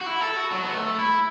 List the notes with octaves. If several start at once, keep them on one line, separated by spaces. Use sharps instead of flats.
F#4
E4
A4
F#4
F#3
B3
A3
E4